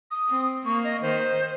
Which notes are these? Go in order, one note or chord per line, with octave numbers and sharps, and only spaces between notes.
D#6
C4
A#3 C#6
D#5
D#3 C5